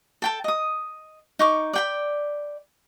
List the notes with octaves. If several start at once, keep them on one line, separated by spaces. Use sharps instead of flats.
A4 G5 A5
D#5 D#6
D#4 C#6 D6
D5 G5 B5